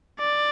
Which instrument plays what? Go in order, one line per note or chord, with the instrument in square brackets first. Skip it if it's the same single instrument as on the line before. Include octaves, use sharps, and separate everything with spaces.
[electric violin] D5